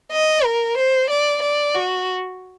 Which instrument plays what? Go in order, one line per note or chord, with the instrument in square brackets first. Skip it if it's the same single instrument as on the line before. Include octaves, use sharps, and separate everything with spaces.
[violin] D#5
A#4
C5
D5
D5
F#4